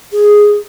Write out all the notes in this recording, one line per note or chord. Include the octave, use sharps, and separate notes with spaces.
G#4